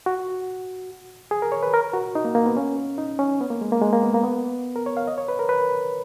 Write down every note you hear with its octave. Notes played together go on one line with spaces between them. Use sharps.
F#4
G#4
A#4
C#5
B4
A#4
F#4
D#4
A#3
A#3
B3
C#4
D#4
C#4
B3
A#3
G#3
A#3
G#3
A#3
B3
A#3
B3
A#4
C#5
F5
D#5
C#5
B4
A#4
B4